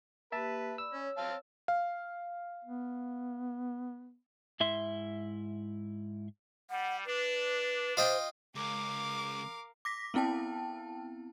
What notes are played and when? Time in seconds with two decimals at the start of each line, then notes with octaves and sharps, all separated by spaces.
0.32 A#3 G4 B4 E5 A5
0.78 D5 B5 E6
0.93 C#4 C#5
1.17 C4 F5 A5
1.68 F5
2.65 B3
4.60 G#2 E4 E5 C6
6.70 G3 F#5
7.06 D4 B4
7.97 F4 C5 D#5 G5
8.55 C#2 A#4 F5 D6
9.85 D6 A#6 B6
10.14 B3 C4 E4 G5 A5